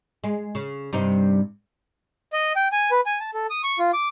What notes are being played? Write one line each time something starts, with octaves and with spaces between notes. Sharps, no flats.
G#3
C#3
G2 C3 D#4
D#5
G5
G#5
B4
G#5
A5
A4
D#6
C#6
F4
D6